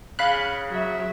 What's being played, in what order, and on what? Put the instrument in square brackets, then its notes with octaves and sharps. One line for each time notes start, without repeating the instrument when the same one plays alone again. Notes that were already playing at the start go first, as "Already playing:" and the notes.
[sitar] C#3 [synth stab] F5 B5 F#6
[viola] F#3 E5